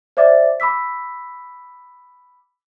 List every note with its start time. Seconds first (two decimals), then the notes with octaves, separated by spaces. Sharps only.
0.17 C5 D5 E5 D6 A6
0.60 B5 D6 E6 B6